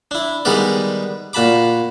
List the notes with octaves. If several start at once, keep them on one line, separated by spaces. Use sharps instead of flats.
D4 E4
D#3 G3 G#3 B3 B4 D5
A#2 F#4 A5 B5 D6